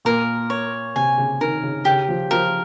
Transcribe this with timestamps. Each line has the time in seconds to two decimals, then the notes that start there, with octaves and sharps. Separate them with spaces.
0.05 A#2 A#4
0.50 C#5
0.96 C3 G#5
1.18 C#3
1.41 D#3 A#4
1.63 C#3
1.85 C#3 G4
2.09 F3
2.31 F3 A#4